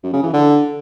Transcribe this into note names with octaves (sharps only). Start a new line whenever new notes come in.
F#2
C#3
E3
D3